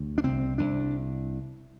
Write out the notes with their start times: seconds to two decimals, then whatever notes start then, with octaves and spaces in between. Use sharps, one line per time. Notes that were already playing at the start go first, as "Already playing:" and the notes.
Already playing: D2
0.18 D4
0.23 C2 C4
0.58 C2 D4